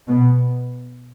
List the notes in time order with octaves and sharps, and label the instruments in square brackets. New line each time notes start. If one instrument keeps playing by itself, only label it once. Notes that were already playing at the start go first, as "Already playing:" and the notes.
[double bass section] B2 B3